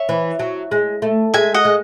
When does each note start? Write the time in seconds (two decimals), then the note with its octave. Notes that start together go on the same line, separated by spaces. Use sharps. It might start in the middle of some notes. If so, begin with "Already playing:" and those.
Already playing: C#5 E5
0.09 E3
0.39 F#3
0.71 G#3
1.02 A3
1.34 G#3 E5 G#5
1.54 D#5 F#5
1.65 G#3